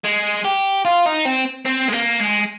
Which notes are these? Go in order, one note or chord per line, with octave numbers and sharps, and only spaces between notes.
G#3
G4
F4
D#4
C4
C4
G#3
A#3
G#3